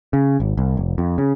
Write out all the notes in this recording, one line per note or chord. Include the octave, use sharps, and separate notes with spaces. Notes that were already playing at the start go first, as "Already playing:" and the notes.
C#3
G#1
C2
F1
F2
C#3